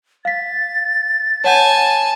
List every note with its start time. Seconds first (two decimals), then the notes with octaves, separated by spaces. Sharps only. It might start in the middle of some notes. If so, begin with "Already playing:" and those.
0.25 F5 A6 B6
1.44 C#5 F#5 G#5 A5 G6